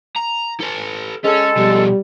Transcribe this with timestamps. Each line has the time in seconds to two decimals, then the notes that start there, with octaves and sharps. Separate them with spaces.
0.16 A#5
0.60 A4 B4
1.24 G#3 C#4 G#4 A4
1.57 B2 F3 G3